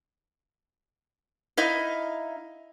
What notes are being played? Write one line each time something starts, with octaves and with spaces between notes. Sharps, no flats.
D#4 E4 D#5 F5